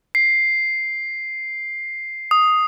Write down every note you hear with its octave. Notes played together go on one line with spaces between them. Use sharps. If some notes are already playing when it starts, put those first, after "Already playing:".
C7
D#6